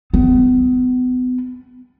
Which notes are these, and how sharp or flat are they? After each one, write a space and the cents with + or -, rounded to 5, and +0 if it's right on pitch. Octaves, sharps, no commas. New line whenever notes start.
B3 +30